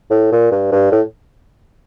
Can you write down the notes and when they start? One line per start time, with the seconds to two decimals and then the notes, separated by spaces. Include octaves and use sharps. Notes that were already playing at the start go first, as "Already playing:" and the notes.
0.10 A2
0.32 A#2
0.51 G2
0.72 G2
0.92 A2